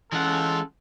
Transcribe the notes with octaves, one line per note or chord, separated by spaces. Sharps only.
E3 G#3 C#4 F4 A4 F#5